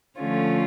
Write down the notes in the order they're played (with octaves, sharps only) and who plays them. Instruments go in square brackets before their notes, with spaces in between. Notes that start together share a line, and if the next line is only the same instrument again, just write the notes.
[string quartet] D3 F3 A3 C#4 F4